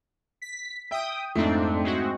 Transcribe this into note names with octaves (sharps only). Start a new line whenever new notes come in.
B6
E5 G5 D#6
F2 G#2 A3 C4 D4
G#3 C4 F#4